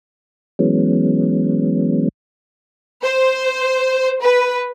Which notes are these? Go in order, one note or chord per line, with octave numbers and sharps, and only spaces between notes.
E3 F#3 G#3 B3 C#4
C5
B4